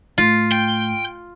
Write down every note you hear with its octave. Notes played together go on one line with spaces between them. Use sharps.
A2 F4
G5